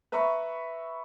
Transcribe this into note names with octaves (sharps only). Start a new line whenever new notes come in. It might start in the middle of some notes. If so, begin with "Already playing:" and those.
B4 E5 A#5 B5 C#6